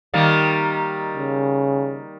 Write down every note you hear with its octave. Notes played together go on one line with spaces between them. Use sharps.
D#3 G3 A#3
C#3